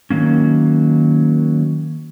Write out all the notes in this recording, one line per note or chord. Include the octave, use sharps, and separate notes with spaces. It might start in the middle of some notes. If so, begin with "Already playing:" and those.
D#3 F#3 A#3 C#4